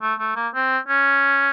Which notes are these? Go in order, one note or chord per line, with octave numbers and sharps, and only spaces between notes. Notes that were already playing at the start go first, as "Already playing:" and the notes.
A3
A3
A#3
C4
C#4